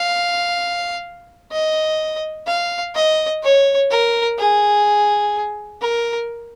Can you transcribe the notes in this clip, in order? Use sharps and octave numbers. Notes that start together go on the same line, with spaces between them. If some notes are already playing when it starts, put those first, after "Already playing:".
Already playing: F5
D#5
F5
D#5
C#5
A#4
G#4
A#4